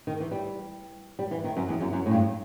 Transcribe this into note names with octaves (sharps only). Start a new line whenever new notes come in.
D#3
E3
G3
G3
E3
D#3
F#2
E2
F#2
F#2
A2
G2